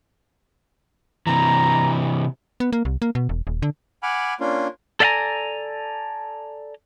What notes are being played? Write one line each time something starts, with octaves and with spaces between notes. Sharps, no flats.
C3 E3 A#5
B3
A#3
C2
A#3
B2
E1
D#1
D3
F#5 G#5 B5 D6 F6
A#3 C#4 D4 F4
A4 D5 E5 F#5 G#5 A#5